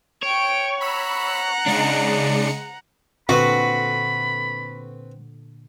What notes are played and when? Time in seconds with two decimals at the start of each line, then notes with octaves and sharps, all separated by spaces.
0.23 C#5 G5 D7
0.81 F#5 A#5 B5 E6
1.66 C#3 G#3 D4 D#4 C#7
3.29 A#2 D3 C4 F#4 A4 B4 B5